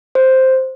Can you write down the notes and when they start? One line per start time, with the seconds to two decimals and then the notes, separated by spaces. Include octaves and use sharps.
0.15 C5